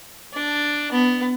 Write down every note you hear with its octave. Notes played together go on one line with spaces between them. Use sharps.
D4
B3